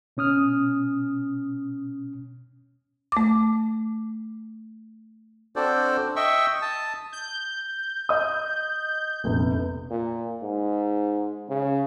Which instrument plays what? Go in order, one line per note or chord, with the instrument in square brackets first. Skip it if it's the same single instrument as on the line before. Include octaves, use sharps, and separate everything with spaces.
[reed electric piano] B2 C#4 D#6 F6
[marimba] A3 D6
[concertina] C4 D4 F#4 A4 C5 D5
D#5 E5 G5 C#6 E6
A5 D#6
[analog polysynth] G6
[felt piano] D#5 D#6
F1 A#1 B3
[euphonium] A#2
G#2
C#3